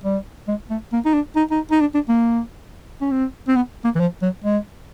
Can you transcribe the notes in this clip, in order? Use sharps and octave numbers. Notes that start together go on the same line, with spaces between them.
G3
G#3
A3
A#3
D#4
D4
D#4
D#4
D#4
D4
D4
A#3
C#4
C4
C4
B3
A#3
E3
F3
F#3
G#3